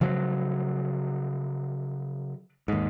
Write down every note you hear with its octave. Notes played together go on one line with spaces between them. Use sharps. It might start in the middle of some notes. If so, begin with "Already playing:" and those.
C#3 F3 F#3
D#2 G#2